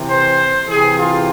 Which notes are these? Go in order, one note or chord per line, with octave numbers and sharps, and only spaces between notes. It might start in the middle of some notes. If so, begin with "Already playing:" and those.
Already playing: C3 E3
C5
C3 E3 G#4
F4